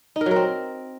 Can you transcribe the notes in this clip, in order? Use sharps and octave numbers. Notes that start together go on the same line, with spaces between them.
D#4
A#4
F#3
A#4
C4